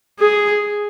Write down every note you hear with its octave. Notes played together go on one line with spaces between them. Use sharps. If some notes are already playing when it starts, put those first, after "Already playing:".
G#4